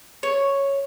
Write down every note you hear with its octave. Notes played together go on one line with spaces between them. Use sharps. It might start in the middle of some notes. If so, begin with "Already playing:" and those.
C#5